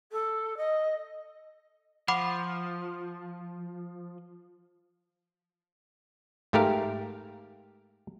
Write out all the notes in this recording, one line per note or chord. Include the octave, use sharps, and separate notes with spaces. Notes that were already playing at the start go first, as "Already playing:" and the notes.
A4
D#5
F3 F#5 B5 D6
G#2 A3 G4 A#4 F5